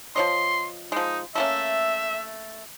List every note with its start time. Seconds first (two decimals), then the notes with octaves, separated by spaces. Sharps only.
0.16 F3 C#5 D#5 C6
0.92 F3 G#3 D#4
1.35 A3 A#3 C#4 E5